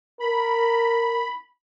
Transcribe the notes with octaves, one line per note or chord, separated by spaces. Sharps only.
A#4 B5